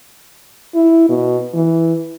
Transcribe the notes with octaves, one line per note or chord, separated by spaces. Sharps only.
E4
B2
E3